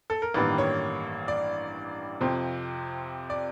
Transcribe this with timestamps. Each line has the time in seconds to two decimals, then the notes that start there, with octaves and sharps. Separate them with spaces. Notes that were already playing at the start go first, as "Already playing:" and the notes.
0.10 A4
0.22 A#4
0.34 A1 G2 D#3 G3 A#3 B4
0.58 C#5
1.28 D5
2.21 F2 C3 F3 C5
3.30 D5